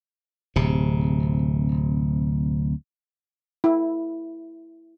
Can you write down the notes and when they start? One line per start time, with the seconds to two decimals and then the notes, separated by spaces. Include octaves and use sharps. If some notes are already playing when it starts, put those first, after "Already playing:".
0.56 D1 C3
3.64 E4